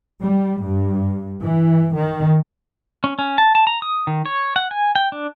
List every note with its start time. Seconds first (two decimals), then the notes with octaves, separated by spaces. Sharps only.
0.23 G3
0.65 G2
1.43 E3
1.95 D#3
3.04 C#4
3.19 C#4
3.38 A5
3.55 A5
3.67 A#5
3.82 D#6
4.07 D#3
4.26 C#5
4.56 F#5
4.71 G#5
4.95 G5
5.12 D4